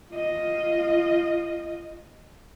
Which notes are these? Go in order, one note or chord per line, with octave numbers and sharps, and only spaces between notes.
F4 D#5